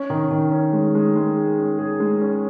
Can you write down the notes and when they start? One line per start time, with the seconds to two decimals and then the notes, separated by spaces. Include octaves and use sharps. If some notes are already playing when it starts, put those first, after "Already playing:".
Already playing: C#4
0.10 D#3
0.31 D#3
0.51 C#4
0.73 G#3
0.95 G#3
1.16 G#3
1.37 G#4
1.58 C#4
1.79 G#4
2.00 G#3
2.21 C#4